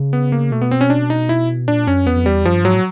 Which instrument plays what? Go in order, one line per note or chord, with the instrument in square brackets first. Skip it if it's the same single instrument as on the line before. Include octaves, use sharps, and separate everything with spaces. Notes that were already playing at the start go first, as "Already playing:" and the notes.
Already playing: [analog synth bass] C#3
[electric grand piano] B3
A#3
[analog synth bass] B2 [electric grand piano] A3
[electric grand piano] B3
C4
C#4
D4
D#4
E4
[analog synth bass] A#2 [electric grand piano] D4
[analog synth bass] F#2 [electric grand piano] C#4
[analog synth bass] E2 [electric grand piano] B3
[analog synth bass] F2
[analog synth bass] E2 [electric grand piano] G3
[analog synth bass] F#2 [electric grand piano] F3
[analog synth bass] G2
[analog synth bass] G#2 [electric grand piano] F#3
[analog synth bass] A2